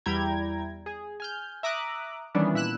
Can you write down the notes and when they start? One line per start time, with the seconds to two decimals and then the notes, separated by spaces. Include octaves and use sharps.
0.06 E2 G3 E4 G5 A#5 G#6
0.86 G#4
1.20 G#5 F6 G6
1.63 E5 A#5 D6 D#6 F#6
2.35 D#3 E3 G3 B3 C#4 D4
2.54 A#2 E4 E6 F#6 E7